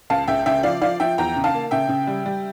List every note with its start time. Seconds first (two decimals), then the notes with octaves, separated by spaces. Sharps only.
0.10 C#2 F5 A5
0.28 C#2 E5 G5
0.46 C#3 E5 G5
0.63 F3 D5 F5
0.82 F3 D5 F5
1.00 F3 E5 G5
1.18 E2 G5 A#5
1.36 C#3
1.44 F5 A5
1.54 A#3
1.71 C#3 E5 G5
1.89 C#3
2.07 G3
2.26 G3